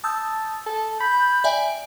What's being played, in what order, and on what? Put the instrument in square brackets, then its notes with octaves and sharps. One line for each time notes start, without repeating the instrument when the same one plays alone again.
[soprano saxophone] A5 [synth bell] D#6 E6 G6
[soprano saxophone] A4
[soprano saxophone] B5 [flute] G6
[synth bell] D5 E5 G#5 [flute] G5